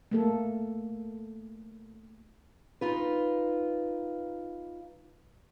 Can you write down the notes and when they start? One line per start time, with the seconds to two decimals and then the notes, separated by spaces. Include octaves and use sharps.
0.11 A3 A#3 A4
2.81 D#4 F4 B4